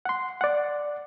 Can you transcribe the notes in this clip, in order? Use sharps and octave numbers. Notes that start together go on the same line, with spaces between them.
F#5 C6
D5 F#5